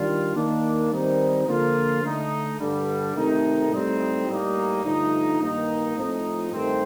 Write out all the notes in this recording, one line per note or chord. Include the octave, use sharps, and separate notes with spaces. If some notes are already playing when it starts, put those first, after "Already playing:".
Already playing: D#3 G3 D4 F4
D#3 A#3 D4
D#3 G3 C4 D#4
D3 F3 A#3 F4
D3 A3 D#4
G2 D3 G3
C3 D#3 A3 D#4
A2 G3 C4 D#4
A2 G3 A#3 D#4
G2 D3 F3 A3 D#4
G2 D#3 A#3 D#4
A2 F3 C4 D#4
G2 D#3 A3 C4